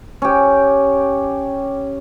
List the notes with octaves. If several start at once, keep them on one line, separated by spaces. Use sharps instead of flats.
C#4 G4